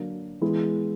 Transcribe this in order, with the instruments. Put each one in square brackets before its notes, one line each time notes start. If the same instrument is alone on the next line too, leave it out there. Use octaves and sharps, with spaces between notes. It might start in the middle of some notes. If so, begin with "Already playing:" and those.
Already playing: [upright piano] D3 F#3 A#3
E3 G#3 B3 E4